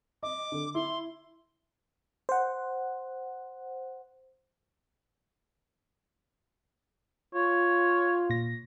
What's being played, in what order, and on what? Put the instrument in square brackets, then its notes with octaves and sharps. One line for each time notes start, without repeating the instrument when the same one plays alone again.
[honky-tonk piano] D#5 [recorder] D6
[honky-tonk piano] D3
[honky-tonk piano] E4 [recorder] C6
[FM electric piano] C5 F#5
[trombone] F4 [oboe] C#5
[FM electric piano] A#2 A#6